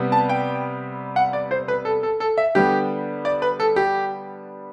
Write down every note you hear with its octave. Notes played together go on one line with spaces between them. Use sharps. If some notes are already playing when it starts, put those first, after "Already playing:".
Already playing: C3 G3 B3
A5
G5
F#5
D5
C5
B4
A4
A4
A4
E5
D3 G3 B3 G4
D5
B4
A4
G4